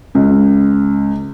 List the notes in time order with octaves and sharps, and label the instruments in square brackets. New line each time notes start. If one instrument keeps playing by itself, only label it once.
[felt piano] C#2